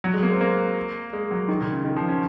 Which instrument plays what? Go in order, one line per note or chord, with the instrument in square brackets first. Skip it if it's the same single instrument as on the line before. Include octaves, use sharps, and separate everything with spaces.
[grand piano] F#3
G#3
A#3
C4
A#3
G#3
F#3
D#3
A#2
C#3
D#3
F3
C#4